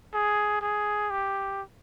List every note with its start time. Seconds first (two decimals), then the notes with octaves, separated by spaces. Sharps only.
0.14 G#4
0.62 G#4
1.11 G4